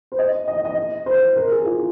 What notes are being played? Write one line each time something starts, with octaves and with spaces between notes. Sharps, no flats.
C5
D#5
D#5
D#5
C5
A#4
G#4
F4